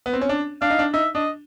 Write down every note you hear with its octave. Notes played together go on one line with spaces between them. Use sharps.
B3
C4
C#4
D4
D4 F5
D#4
D4
D#4 E5
D4 D#5